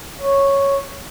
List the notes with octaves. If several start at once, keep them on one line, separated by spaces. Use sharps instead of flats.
C#5